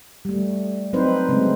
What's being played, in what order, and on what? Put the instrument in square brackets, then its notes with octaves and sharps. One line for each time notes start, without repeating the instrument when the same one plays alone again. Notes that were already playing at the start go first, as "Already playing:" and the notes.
[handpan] G3 A3
F#3 C4 D#4 B4 C5
C#3 F#3 G#3 A3 C4